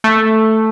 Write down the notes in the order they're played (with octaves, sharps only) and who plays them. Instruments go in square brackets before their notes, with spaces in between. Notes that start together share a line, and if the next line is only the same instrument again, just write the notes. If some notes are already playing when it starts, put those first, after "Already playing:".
[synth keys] A3